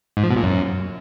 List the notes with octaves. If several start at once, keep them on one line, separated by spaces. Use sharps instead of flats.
G#2
F3
B2
A#2
F#2